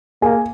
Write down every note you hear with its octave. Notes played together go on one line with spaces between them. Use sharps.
A#3 G#4 G#5